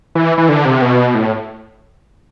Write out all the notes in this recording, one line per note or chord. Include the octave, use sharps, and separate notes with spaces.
E3
E3
D3
C3
B2
A2